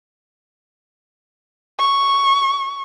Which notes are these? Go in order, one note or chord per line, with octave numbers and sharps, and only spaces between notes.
C#6